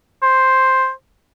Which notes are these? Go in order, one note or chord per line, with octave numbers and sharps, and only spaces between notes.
C5